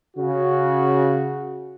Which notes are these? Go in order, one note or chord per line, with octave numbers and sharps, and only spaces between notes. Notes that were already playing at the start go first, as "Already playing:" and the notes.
C#3 F#4